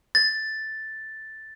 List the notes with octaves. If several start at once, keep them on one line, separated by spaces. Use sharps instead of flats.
A6